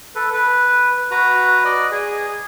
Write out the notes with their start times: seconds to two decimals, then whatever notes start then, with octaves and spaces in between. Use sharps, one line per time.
0.15 A4 B4
0.34 B4
1.11 F#4 B4 A#5
1.65 D5 D#5
1.91 G#4